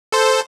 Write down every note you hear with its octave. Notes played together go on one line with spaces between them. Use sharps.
A4 C5